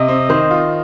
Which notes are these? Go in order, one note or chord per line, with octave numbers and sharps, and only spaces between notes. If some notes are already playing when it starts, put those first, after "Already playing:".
Already playing: C3 D#5
C4
D#3 C5
F4